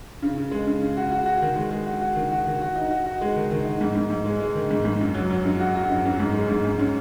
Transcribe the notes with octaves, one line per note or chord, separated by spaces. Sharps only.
C#3
C#3
G#3
C#3
C#3
F#4
F#4
F#4
D#3
G#3
G#3
F#4
F#4
D#3
F#4
D#3
F#4
D#4
F#4
F#4
G#3
D#3
D#3
D#4
G#2
G#2
G#2
G#3
G#3
D#3
G#2
G#2
F#2
F#3
F#3
F#2
F#4
F#4
F#2
F#2
G#2
G#3
G#2
G#2
C#4